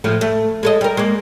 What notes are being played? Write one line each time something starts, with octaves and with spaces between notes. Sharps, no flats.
A2 F3 A3
A3
G#3 A4 D#5
G3 A#4
G#3 A#3